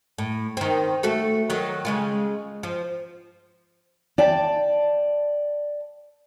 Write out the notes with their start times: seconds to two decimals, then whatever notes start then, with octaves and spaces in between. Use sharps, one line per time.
0.18 A2
0.57 D#3 C4
1.03 A3 F#4 A4
1.50 D#3 F#3
1.85 C#3 G#3 F4
2.63 F3
4.18 D5 G5 A5